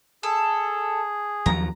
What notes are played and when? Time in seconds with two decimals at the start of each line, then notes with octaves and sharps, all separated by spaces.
0.23 G#4 A4
1.46 D#2 F3 F#3 A#5